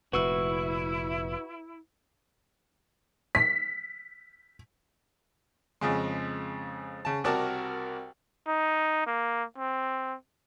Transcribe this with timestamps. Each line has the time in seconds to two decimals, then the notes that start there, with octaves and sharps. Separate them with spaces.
0.13 F1 A#2 E4 F#4 B4 E6
3.35 B6
5.81 F2 C#3 G#3
7.05 C#3 A5
7.24 C2 F#4 A#4 D5 A5
8.47 D#4
9.06 A#3
9.58 C4